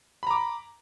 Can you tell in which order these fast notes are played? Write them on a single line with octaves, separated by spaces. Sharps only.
B5 A#5 D6